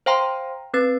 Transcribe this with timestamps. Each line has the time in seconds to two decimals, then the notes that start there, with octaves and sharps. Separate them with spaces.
0.06 C5 F5 G5 A#5 C6
0.74 C4 B4 A6